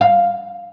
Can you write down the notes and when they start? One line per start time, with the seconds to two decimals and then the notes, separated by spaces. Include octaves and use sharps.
0.01 F5